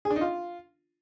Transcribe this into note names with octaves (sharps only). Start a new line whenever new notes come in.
G#4
D4
D#4
F4